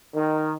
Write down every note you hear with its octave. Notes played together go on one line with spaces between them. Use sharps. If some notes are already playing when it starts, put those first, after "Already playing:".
D#3